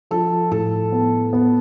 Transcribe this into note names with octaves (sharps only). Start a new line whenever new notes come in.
F3 A4
A2 A4
B3
B3